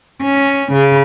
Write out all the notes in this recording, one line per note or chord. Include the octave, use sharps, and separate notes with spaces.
C#4
C#3